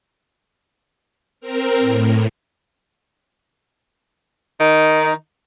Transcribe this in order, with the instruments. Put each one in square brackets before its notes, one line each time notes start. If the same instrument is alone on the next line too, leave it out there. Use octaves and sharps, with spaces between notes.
[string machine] C4 A#4
A2
[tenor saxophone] D#3 [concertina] D#4